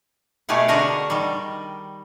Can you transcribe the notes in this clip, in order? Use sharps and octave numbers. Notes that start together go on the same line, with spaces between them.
B2 A3 G4 G#4 F5 F#5
D3 D4 F#4 A#4 D#5
D#3 G3